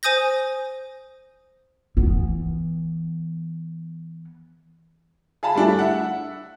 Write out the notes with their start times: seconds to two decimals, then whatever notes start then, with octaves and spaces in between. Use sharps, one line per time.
0.03 C5 G#5 D#6 G6 A#6
1.97 E3 B3
5.43 G#4 F5 A5 B5
5.55 G3 A3 D4 E4
5.79 E5 F#5